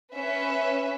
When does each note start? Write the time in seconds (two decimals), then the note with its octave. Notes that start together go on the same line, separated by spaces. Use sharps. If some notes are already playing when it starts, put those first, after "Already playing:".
0.15 C#4 B4 E5